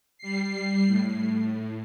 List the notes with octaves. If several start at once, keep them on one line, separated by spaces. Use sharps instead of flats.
G3 C7
A2